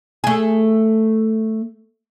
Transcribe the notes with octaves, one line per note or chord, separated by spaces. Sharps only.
A3 G#4